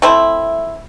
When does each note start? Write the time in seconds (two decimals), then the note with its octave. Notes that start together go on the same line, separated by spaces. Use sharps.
0.02 A3 C4 E4